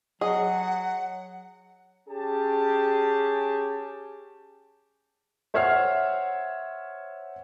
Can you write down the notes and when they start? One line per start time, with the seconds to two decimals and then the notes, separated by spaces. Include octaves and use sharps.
0.21 F#3 G#4 D#5 F#5
2.09 C#4 G4 G#4 A5
5.54 C5 C#5 E5 F#5 F6 C7